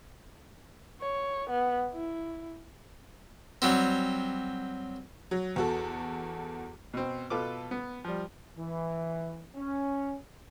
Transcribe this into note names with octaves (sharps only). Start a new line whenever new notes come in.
C#5
B3
E4
F#3 G3 C4
F#3
E2 F#4 A4
B2 C4
B2 F4 A4 B4 D6
B3
F3 G3
E3
C#4